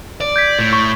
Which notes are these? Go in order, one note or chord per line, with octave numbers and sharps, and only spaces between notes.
D5
G6 G#6 B6
A2
C#6